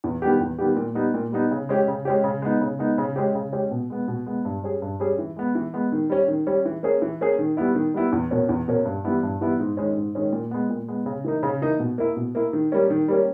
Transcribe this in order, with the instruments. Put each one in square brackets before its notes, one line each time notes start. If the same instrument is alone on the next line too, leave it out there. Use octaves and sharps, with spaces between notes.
[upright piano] E2
D#3 G3 B3 G4
E2
D#3 G3 B3 G4
A#2
G3 B3 D#4
A#2
G3 B3 D#4
C#3
G#3 C#4 G4
C#3
G#3 C#4 G4
C#3
G#3 B3 D#4
C#3
G#3 B3 D#4
C#3
G#3 C#4 G4
C#3
G#3 C#4 G4
B2
G#3 B3
B2
G#3 B3
G2
G3 C#4 G#4
G2
G3 C#4 G#4
E3
G#3 B3
E3
G#3 B3
D#3
G3 C#4
D#3
G3 C#4
E3
A#3 C#4 G#4
E3
A#3 C#4 G#4
D#3
G3 B3 E4
D#3
G3 B3 E4
E2
B2 A#3 C#4
E2
B2 A#3 C#4
G2
E3 G3 B3 E4
G2
E3 G3 B3 E4
G#2
D#3 G#3 C#4
G#2
D#3 G#3 C#4
A#2
G#3 B3
A#2
G#3 B3
C#3
E3 A#3 D#4
C#3
E3 A#3 D#4
B2
A#3 E4
B2
A#3 E4
D#3
G3 A#3 C#4
D#3
G3 A#3 C#4